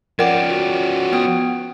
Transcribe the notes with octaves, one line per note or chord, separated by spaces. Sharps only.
F3 C#4 A#4 D5 F#5 G5 D6
F#4
B3 G5 D#6